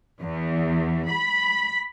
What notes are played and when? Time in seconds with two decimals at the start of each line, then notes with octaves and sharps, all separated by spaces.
0.22 E2
1.10 B5